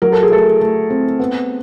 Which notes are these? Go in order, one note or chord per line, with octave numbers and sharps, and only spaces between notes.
F#3 A#4
A4
G#4
A3 A4
A3
C4
B3